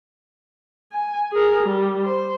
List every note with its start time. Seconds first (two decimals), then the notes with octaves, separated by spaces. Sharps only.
0.92 G#5
1.32 G#4 A#4
1.64 G3
2.04 C5